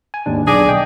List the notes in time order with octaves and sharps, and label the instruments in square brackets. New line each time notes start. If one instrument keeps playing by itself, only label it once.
[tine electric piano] G#5
G#1 D#2 D4
[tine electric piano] B1 D4 A#6 [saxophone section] G#4 D5
[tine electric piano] D#5 G5